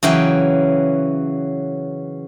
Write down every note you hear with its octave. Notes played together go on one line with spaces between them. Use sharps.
C#3 E3 F#3 G5